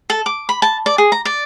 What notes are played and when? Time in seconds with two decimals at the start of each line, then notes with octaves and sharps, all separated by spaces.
0.10 A4
0.26 D6
0.49 B5
0.62 A5
0.86 D5
0.98 G#4
1.12 A#5
1.25 D5